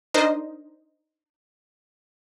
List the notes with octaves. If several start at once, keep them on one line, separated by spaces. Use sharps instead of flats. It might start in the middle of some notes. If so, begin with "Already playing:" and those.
D4 D#4 A#4 C5 D#5